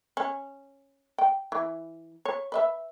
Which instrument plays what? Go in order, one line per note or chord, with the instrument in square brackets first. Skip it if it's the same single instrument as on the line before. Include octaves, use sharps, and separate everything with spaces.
[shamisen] C#4
G5
E3
C#5
B4 D#5 E5